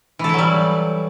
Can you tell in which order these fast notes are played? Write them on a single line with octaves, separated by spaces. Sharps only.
E3 A4 E4 F#3 G3